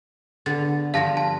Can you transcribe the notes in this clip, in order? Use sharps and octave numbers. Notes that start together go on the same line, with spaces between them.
D3 B3 A6
G2 F3 F5 A5 A#6
B4 A5